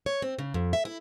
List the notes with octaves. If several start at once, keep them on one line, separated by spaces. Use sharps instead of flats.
C#5
C4
C#3
F2
E5
E4